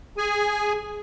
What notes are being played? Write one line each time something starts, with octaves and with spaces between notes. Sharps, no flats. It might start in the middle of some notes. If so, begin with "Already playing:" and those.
G#4 G#5